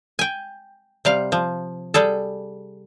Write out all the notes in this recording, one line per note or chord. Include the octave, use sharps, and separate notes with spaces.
G5 G#5
C3 G3 F5
F3
G3 G#4 A4